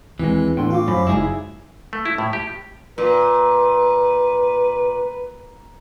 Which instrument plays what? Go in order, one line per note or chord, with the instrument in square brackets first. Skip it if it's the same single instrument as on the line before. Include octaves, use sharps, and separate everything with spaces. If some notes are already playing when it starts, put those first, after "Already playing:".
[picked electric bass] D#2 G#3 [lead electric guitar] E3 [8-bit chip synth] C4
[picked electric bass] A2 [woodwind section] D3 B3 D4 [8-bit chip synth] G5 C6
[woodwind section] F4 [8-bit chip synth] F#4 F5 D6
[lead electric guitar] F#2 [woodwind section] C#4 C5 B5
[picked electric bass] F#1 [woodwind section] G3 G#3 D#4 [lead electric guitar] E4 G#4
[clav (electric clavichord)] A3
E4
A2
G4
[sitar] A#2 [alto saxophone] B4